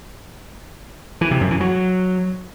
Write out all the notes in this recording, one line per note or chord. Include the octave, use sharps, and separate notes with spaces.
E3
C3
F#2
E3
F#3